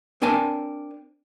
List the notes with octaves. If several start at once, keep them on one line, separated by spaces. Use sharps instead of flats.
C4 D4 A#4 G#5 A5